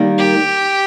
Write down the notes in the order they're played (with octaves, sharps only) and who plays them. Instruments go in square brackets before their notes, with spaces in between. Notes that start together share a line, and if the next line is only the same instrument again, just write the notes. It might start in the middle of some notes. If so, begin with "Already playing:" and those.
Already playing: [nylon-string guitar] D#3 G3 A#3
[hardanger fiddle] G4